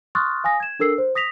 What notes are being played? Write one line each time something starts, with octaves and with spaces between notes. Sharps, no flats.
C6 C#6 D#6 F6 F#6 A6
F5 G#5 D#6 A#6
G#6 E7
D4 A4 A#4 E6 C7
C5
D#6 A#6 B6 F7